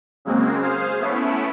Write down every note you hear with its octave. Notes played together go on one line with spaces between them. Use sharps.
C#3 F#3 G#3 A#3 C4
G#4 C5 F5
A3 B3 C#4 E4